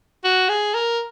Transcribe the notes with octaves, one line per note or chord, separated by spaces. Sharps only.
F#4
G#4
A#4